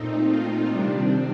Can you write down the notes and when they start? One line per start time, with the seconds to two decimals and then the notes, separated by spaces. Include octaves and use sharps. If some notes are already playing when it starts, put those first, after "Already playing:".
Already playing: A#2 A3 C4 D#4
0.27 F4
0.71 C3 D#3 G3 C4 D4